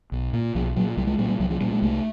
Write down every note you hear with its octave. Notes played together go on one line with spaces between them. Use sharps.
B1
A#2
B1 F3
A#2 F#3
C2 G3
G#3
A#2 G3
G3
C2 F#3
F3
A#2 G3
G#3
C2 A3